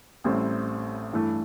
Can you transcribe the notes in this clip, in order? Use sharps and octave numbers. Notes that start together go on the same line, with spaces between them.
A1 A2 G3 C4
G2 E3 A3